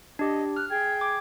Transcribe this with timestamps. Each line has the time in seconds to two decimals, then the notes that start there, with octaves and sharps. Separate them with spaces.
0.19 D4 G4 D#5
0.56 F6 F#6
0.69 G#4 G5 G#6
1.01 D6